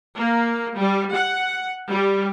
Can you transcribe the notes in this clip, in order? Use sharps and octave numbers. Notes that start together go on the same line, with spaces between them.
A#3
G3
F#5
G3